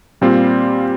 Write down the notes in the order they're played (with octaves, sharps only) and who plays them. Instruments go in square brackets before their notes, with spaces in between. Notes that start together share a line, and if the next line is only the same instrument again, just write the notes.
[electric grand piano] A#2 G3 C4 F4